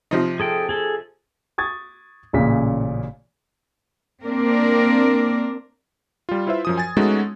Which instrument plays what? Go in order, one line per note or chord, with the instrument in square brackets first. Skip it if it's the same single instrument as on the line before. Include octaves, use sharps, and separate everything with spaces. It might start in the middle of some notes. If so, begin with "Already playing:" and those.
[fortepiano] C3 F3 D#4
[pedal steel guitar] G#4 A4 G5
G#4 A4
[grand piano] C#6 D#6 G#6 A6
A1 A#2 C#3 B6
[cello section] A#3 C4 D4 A#4 D5
[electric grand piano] G3 F4
E4 F4 B4 C5 E5
F#2 F3 D#6
G#5 G#6 A6
G#3 A3 B3 C#4 D#4 F#4